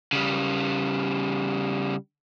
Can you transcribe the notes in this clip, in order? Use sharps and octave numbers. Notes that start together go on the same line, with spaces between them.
C#3 G3